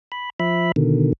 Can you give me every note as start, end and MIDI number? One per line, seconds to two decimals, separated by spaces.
0.12 0.30 83
0.40 0.72 53
0.40 0.72 76
0.40 0.72 83
0.76 1.13 47
0.76 1.13 50
0.76 1.13 51